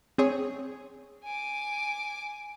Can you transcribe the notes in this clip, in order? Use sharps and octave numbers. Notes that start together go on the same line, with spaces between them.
C4 G#4 C#5
G#5 D6